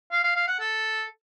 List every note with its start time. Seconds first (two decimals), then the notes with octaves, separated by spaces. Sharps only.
0.12 F5
0.24 F5
0.36 F5
0.48 F#5
0.60 A4